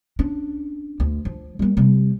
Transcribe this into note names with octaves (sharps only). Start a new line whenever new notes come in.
C#4 D4
D2
F3
G3 A#3
C3 G3